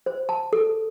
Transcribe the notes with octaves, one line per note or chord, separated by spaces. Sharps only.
C5
A5
A4